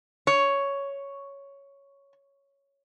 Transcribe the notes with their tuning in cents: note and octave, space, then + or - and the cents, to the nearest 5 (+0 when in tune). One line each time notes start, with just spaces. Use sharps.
C#5 +5